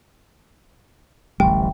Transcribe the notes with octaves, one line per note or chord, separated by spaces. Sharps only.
D1 A1 G3 G5